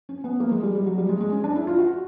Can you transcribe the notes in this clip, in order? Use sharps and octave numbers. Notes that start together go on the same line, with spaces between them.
C#4
B3
A#3
G#3
G3
G3
F#3
G3
G#3
G#3
C#4
D4
E4
F4
F#4